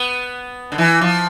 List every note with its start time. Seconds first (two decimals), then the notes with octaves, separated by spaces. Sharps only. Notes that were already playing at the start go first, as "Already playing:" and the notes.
Already playing: B3
0.72 D3
0.78 E3
1.01 F3